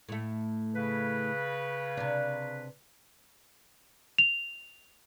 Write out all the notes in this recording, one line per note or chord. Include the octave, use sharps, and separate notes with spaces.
A2 A3
C#3 B4
C3 D4
F7